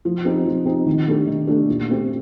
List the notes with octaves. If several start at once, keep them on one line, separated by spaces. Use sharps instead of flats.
F3
C4 D#4 G4
F3
C4 D#4 G4
D#3
A3 D4 G4
D#3
A3 D4 G4
A#2
A3 C4 G4